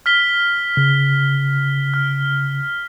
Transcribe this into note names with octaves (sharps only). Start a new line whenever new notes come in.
F6 B6 G7
C#3
F6